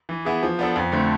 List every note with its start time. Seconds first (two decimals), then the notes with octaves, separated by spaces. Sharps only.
0.09 E3
0.25 B3 E4 G#4
0.43 F3
0.59 B3 D4 A4
0.76 F2
0.92 D3 A3 C4